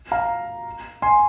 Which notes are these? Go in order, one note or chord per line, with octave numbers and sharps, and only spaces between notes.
F5 A#5
G#5 C6